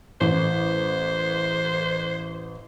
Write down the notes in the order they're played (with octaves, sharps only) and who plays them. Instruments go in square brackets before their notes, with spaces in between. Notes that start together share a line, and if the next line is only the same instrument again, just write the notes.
[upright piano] A1 [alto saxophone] C5